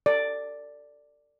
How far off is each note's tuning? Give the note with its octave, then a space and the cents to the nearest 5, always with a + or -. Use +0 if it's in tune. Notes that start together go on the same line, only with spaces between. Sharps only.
A4 +35 D5 +0